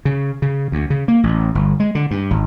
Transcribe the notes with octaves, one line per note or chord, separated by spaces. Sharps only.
C#3
C#3
D2
C#3
A#3
A1
G1
G#3
D3
G2
G#1